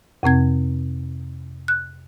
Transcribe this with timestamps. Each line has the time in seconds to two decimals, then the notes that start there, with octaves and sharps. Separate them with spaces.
0.23 F2 C3 C4 G#6
1.68 F#6